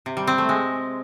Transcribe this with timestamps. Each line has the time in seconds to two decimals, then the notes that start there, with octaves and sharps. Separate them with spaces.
0.06 C3
0.17 G3
0.27 C4
0.38 A3
0.49 G#3